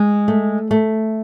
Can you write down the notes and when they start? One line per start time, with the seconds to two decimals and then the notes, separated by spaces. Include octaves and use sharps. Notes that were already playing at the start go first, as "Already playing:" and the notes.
Already playing: G#3
0.28 A3
0.71 A3